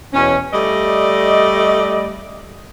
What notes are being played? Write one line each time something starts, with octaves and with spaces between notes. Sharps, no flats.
E2 B2 C#4
G3 A3 D5 D#5